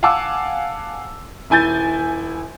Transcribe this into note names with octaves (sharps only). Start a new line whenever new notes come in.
F5 F#5 G#5 A5 D6 E6
D#1 E4 G#5 G6 A6